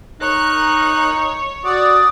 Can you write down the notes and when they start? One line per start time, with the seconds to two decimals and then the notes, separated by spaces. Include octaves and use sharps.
0.21 D#4 A#4 C#5 F#6
1.64 F#4 D5 D#6